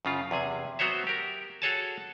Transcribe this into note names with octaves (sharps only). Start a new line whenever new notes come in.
F#2 C#3 F4
E2 C3 G#4 G#5
F#3 B3 F#4 C5 C#5 E5
G4 A#4
F#4 G#4 A4 C#5 G#5 A5